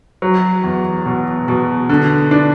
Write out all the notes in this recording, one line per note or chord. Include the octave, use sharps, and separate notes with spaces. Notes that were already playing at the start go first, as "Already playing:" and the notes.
F#3
E2
B2
B2
D3
D4